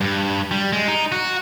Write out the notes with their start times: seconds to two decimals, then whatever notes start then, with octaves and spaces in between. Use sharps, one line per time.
0.01 G2
0.51 G3
0.73 G#3
0.88 D#4
1.12 F#4